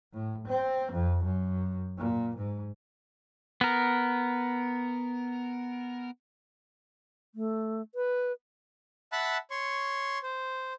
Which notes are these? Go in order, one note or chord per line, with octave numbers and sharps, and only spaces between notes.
A2
C4
F2
F#2
A#2
G#2
B3 A#4
A3
B4
E5 F#5 A5 B5 F#6
C#5 C6 C#6
C5